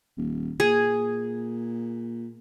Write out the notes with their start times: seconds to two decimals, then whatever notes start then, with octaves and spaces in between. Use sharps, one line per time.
0.18 D#1
0.60 A#2 G#4